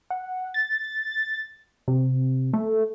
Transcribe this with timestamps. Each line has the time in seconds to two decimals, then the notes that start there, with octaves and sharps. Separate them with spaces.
0.10 F#5
0.54 A6
1.88 C3
2.53 A3